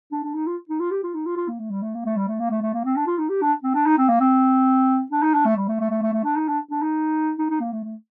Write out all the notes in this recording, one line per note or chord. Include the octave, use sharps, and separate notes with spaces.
D4
D4
D#4
F4
D#4
F4
G4
F4
D#4
F4
F4
A#3
A3
G3
A3
A#3
A3
G3
A3
A#3
A3
A3
A#3
C4
D4
F4
D#4
G4
D4
C4
D4
D#4
C4
A#3
C4
D4
D#4
D4
A3
G3
A3
A3
A3
A3
A3
D4
D#4
D4
D4
D#4
D#4
D#4
A#3
A3
A3